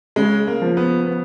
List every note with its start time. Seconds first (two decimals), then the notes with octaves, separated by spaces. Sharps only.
0.16 C#3 G#3
0.47 A#3
0.62 F3
0.77 B3
1.06 B3